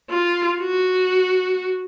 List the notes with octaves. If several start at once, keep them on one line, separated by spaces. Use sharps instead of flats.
F4
F#4